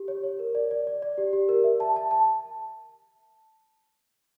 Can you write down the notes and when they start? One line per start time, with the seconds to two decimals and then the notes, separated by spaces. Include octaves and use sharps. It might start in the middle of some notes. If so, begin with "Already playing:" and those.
Already playing: G4
0.08 C#5
0.24 C#5
0.39 A#4
0.55 D5
0.71 D5
0.87 D5
1.02 D5
1.18 G4
1.33 G4
1.49 A#4
1.64 E5
1.80 A5
1.96 A5
2.11 A5